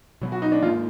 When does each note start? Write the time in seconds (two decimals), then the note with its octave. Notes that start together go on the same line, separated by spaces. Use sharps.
0.21 B2 F#3 B3
0.32 F#4
0.42 D#4
0.52 D4
0.62 G#2 D#3 A#3 F4